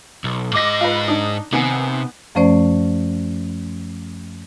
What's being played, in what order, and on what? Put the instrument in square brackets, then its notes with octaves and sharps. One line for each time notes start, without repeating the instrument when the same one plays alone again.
[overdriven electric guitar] B1
[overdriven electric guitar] G#2 D#5 [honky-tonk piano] D6 A#6
[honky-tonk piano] F4 B4
D4 D#4
[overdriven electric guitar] C3 [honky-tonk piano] D#3 B3 G#5
[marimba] F#2 F3 A3 C#4 C5 D5